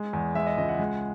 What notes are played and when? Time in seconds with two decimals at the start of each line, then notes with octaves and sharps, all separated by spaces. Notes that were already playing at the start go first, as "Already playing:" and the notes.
Already playing: G#3
0.13 E2
0.35 G#3 E5
0.46 D#5
0.57 C#2 D#5
0.69 F#5
0.79 G#3